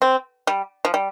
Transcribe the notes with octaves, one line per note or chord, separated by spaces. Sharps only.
C4
G3
F3
G3